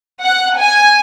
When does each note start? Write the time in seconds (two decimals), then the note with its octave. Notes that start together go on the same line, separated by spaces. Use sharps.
0.23 F#5
0.58 G#5